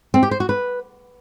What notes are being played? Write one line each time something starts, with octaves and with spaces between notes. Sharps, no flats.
C4
G4
C5
F#4
B4